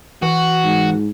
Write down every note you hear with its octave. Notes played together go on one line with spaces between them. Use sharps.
E3 F#4
G#2